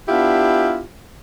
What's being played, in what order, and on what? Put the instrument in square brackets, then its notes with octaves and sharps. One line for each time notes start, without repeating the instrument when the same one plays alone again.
[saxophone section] B3 D4 E4 F4 G4